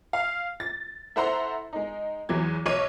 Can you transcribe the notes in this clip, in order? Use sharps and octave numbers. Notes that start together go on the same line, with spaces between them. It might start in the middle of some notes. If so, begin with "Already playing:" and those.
F5
A6
E4 A4 C5 F#5 A#5 C6
G#3 D#4
E2 E3 F#3 G#6
B1 C#5 G#6 D#7